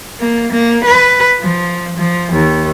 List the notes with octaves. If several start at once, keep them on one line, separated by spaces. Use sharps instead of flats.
A#3
A#3
B4
F3
F3
D#2